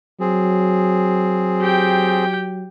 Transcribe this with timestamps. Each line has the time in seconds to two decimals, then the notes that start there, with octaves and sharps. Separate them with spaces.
0.20 F#3 C4 G#4
1.61 G4 G5